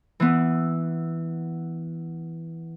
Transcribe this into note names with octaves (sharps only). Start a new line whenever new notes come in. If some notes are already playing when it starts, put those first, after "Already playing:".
E3 B3